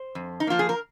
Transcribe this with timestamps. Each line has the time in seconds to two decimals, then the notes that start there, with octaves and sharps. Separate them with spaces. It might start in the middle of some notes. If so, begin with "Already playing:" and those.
Already playing: C5
0.15 F2
0.40 D#4
0.47 F3 A#3 F4
0.59 G#4
0.69 A#4